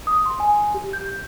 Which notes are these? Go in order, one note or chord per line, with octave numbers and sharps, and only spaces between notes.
D#6
C6
G#5
G4
G6